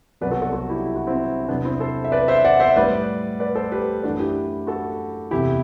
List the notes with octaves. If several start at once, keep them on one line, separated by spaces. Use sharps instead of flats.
C2 B2 F#3 B4 D5
F#4 A4
F#4 A4
F#4 A4
E4 G4
E4
F#4
C4 E4
E2 C3 F#3 B3 D4
C4 E4
A4 C5
E5
B4 D5
C5 E5
D5 F#5
C5 E5
A2 G3 B4 D5
B4 D5
A4 C5
G4 B4
F#2 E3 A3 D4 F#4
E4 G4
F#4 A4
E2 C3 E3 E4 G4